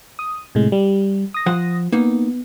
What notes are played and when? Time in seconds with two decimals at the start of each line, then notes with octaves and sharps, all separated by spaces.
0.19 D#6
0.55 A2 C3 G#3
0.72 G3
1.34 D#6 A#6
1.46 F3 C5 F#5
1.92 A#3 B3 D#4